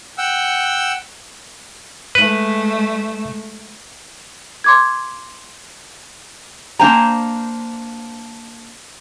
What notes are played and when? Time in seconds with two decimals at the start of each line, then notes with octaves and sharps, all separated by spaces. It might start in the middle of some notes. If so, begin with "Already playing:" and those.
0.18 F#5 G5 E6
2.15 G#3 A3 B4
4.64 C6 D6 G#6
6.79 A#3 D4 C5 G5 G#5 A#5